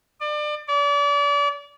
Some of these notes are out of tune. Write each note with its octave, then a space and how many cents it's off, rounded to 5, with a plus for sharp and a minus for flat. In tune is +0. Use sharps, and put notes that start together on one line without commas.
D5 +30
D5 -35